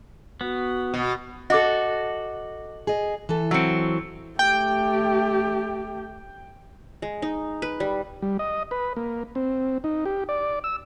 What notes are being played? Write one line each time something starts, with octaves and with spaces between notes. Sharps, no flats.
B3 F#4
B2
F#4 A4 D#5 D6
G#4 D#5
E3 A4
F#3 C4 E6 C#7
A3 G4 G5
G#3
D#4
B4
G3
G3
D#5
B4
A#3
C4
D#4
G4
D5
E6